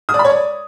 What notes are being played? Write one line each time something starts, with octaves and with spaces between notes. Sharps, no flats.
D#6
D5
B5
C#5
D5